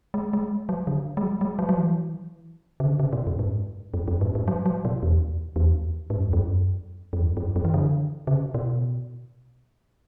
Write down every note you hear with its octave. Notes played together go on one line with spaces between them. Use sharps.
G#3
G#3
F#3
D3
G#3
F#3
G#3
F#3
F#3
E3
C#3
D3
C#3
B2
F#2
G#2
F#2
F#2
G#2
G#2
F#3
F#3
B2
E2
E2
G#2
F#2
E2
F#2
F#2
E2
F#2
F#2
E3
D3
C#3
B2